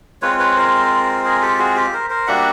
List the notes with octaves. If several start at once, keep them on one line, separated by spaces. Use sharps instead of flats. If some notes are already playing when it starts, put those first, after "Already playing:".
G#3 C4 F4 B4 C#5
B4 C#5
A#4 C5
G#4 A#4
G4 A4
F#4 G#4
G4
A#4 C5
A#4 C5
G3 A#3 D4 F#4 E5 F#5